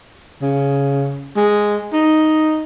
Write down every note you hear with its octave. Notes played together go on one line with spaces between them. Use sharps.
C#3
G#3
D#4